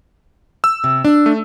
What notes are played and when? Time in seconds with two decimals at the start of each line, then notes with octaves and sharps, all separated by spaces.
0.64 E6
0.84 C3
1.05 D4
1.26 A3